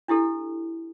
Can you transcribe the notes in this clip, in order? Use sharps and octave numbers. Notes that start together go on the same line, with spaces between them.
D4 E4 G4 A4